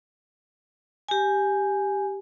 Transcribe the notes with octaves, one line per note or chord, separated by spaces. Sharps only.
G4 G#5